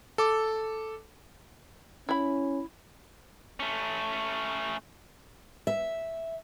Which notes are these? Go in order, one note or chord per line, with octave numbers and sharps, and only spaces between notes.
A4 D6
C#4 E4 B5
A3 C#4
E5